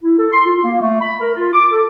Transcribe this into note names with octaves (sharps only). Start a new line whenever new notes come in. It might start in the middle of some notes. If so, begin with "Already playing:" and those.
E4
A4
C6
F4
A#3
A3
B5
A#4
F4
D6
A4